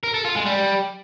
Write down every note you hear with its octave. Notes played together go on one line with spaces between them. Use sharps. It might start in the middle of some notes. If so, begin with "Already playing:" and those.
A#4
A4
F4
G#3
G3